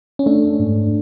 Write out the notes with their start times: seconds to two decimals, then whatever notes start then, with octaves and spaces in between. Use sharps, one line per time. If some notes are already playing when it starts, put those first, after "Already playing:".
0.19 C#4
0.26 A3 D4
0.59 G#2